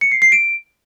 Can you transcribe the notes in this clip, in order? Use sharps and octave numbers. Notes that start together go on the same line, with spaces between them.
C#7
C7
C7
D7